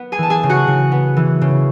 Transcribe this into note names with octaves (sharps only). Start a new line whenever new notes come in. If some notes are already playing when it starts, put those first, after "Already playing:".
Already playing: B3 B4
G#4 G#5
E3 A5
G#4 G#5
C#3
F#4 F#5
C#3
B3
E3
C#3